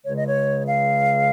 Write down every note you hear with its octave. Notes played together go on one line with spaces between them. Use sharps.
C#2 C#3 G#3 C#5
D#5
C#5
F5